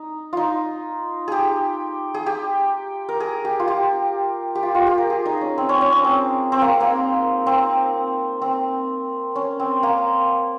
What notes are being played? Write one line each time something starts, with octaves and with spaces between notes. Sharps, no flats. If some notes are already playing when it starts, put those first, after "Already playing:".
Already playing: D#4
D#4 F4
G4 G#4
G#4
G4
A#4
G#4
G4
F4
G4
G4
F4
F4
G4
A#4
G#4
D#4
C#4
C4
C#4
C#4
C#4
C4
C4
A#3
A#3
C4
C4
C#4
C4
A#3